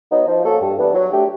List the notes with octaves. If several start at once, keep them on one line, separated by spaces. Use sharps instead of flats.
F#3 B3 D#4
F3
A#3 C#4 F#4 A4
G2
E3 G3 B3 D4
F#3
A3 D4 G4